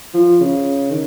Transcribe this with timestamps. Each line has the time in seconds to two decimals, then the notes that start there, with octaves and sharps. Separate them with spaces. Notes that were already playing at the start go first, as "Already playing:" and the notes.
0.14 F3
0.40 C#3
0.91 D#3